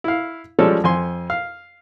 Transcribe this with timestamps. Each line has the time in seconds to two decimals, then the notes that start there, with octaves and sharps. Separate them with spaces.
0.04 E4 F5
0.59 F3 G3 G#3 C#4 A4
0.84 F2 G#5 C6
1.30 F5